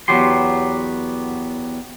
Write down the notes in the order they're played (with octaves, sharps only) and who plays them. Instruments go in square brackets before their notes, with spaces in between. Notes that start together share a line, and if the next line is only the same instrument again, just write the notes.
[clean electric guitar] E2 F#3 B3 G4 C6